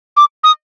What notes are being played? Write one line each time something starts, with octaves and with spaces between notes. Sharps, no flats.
D6
D#6